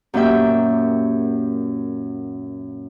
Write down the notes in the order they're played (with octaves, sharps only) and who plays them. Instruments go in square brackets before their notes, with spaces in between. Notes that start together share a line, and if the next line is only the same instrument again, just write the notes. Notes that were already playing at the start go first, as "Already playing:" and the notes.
[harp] F#2 A#2 A#3 G4 E5 G5